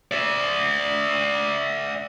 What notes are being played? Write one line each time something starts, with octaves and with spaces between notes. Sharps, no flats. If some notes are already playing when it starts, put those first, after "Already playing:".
D5 E5